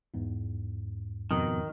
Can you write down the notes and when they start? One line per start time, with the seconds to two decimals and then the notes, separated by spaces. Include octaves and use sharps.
0.14 E2 G#2
1.31 F2 B2 D#3